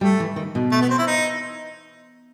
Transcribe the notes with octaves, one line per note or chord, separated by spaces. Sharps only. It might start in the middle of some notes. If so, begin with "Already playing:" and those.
G3 A3
E3
D#3
B2
A3
B3
C4
E4
D#4